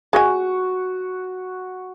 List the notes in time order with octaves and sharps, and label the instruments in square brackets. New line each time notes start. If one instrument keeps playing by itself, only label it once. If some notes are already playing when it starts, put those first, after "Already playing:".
[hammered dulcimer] F#4 [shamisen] G#4 D#5 G#5